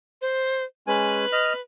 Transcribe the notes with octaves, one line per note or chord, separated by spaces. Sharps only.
C5
G#3 C#4 B4 G#5
D#5 F6